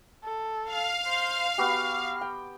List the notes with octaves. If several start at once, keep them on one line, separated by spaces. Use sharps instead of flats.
A4
F5
C5
B3 F#4 G4 F6
G5